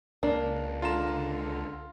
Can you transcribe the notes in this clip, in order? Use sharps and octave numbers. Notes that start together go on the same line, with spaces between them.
C#2 A#3 D4
D3 F4 A#5 E7